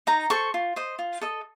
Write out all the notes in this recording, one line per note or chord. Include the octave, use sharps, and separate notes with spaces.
D#4 A#5
A4 C5 C#6
F4
C5 D#5
F4
A4 D#5